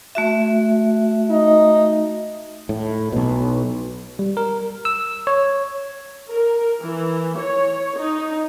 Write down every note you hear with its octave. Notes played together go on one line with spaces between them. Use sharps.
A3 F#4 E5
D#4
A2
B1 B2
G3
A#4
E6
C#5
A#4
E3
C#5
D#4